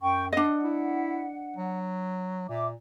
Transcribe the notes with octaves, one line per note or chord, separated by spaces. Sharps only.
F#2 G5 C#6
D4 D#5 F#5
E4
F#3
A#2 E5 D6